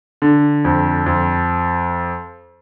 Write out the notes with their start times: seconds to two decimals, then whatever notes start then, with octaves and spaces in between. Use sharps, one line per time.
0.22 D3
0.65 F2
1.06 F2